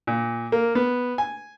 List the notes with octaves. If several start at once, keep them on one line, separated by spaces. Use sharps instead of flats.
A#2
A#3
B3
G#5